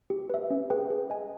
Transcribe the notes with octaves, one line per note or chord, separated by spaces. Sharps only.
G4
B4 E5
C#4
G#4 B4 G5
G#4
D#5 G#5